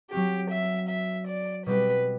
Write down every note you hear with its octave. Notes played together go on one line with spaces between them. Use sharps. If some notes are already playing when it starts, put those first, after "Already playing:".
F#3 C4 F#4 G4
E5
E5
D5
B2 G3 C4 G4 B4